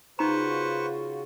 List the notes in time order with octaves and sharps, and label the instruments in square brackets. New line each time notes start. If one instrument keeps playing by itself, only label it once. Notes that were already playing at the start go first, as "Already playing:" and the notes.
[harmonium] C#3 F4 F#4 [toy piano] D#4 A#5 [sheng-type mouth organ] B4 C5 C#6